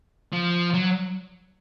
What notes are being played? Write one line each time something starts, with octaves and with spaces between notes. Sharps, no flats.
F3
F#3